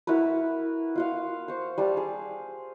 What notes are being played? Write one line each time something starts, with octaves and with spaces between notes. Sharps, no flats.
E4 F#4 A#4 B4
F4 F#4 F5
C5 C#6
G3 F5 A5
G#4